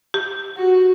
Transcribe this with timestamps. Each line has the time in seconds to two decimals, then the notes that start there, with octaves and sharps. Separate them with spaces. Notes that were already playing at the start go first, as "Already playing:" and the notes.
0.14 G4
0.57 F#4